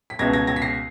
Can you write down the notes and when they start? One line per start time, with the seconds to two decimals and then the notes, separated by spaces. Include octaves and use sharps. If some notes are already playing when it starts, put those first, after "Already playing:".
0.10 B6
0.19 C#2 B2 G#6 A#6
0.33 G#6 A#6
0.47 G#6 A#6
0.56 B6
0.62 A#6 C7